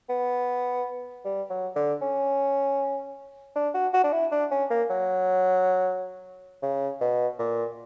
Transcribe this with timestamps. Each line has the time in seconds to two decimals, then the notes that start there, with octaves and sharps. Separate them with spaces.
0.09 B3
1.25 G3
1.50 F#3
1.76 D3
2.02 C#4
3.56 D4
3.74 F#4
3.93 F#4
4.04 D4
4.13 E4
4.32 D4
4.51 C#4
4.70 A#3
4.90 F#3
6.63 C#3
7.01 B2
7.39 A#2